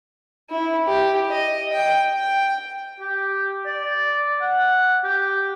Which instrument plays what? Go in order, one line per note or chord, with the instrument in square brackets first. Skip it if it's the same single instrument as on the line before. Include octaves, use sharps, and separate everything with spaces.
[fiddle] E4
G4
D#5
G5
G5
[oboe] G4
D5
F#5
G4